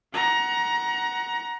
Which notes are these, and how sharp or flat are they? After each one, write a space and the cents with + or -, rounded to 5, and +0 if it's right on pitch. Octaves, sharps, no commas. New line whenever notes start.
F#5 +10 A#5 +25